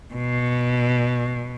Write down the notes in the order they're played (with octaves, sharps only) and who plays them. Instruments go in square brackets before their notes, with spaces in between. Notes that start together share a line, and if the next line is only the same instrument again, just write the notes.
[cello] B2